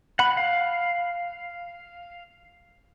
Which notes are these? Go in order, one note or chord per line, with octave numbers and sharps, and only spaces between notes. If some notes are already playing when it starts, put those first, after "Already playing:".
F#5 B5
F5